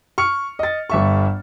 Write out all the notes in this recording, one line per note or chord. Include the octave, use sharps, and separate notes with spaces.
C#6 F6 C#7
D#5 A6
G1 E5 C#6